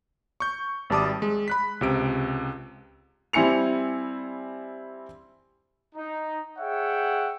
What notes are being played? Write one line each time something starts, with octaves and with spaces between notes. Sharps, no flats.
C#6 G6
G#1 G3 A5 D6 D#6
G#3
B5 F#6 B6
C#2 C3 D7
G3 C4 E4 G#5 C#7 F7
D#4
G#4 C#5 E5 F#5 G5